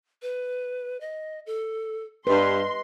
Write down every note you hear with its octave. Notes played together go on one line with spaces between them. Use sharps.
B4
D#5
A4
G2 B4 D#5 C6